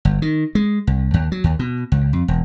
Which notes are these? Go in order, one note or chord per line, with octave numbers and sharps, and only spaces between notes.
G1
D#3
G#3
C2
D#2
F#3
D#2
B2
C#2
F2
E1